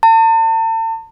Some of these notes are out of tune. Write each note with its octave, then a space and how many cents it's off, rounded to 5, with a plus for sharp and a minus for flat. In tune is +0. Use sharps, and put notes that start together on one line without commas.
A5 +40